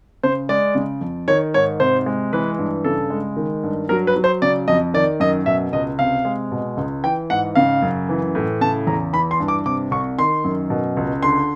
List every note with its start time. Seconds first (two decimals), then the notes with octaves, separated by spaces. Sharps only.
0.23 C#3 C5
0.49 G#3 D5
0.75 C#3
1.01 F2
1.28 D#3 C#5
1.54 G#2 C#5
1.80 C3 C5
2.06 G#3
2.33 E3 B4
2.58 G2
2.84 C#3 A4
3.10 G#3
3.37 D#3
3.63 G2
3.89 F#3 A#4
4.07 B4
4.16 F#3
4.24 C5
4.42 C#3 D5
4.68 F2 D#5
4.94 D#3 D5
5.20 F#2 D#5
5.46 B2 E5
5.73 C#2 D#5
5.99 C3 F5
6.25 G#3
6.52 B2
6.77 C#2
7.04 E3 G5
7.30 G#2 F#5
7.55 C#3 F5
7.82 F#2
8.09 E3
8.35 A2
8.61 C#3 A5
8.87 E2 A#5
9.13 E3 B5
9.31 C6
9.40 G2
9.48 D6
9.66 C3 D6
9.91 C2 C#6
10.19 D#3 C6
10.44 F#2
10.70 B2
10.97 C#2
11.23 D3 C6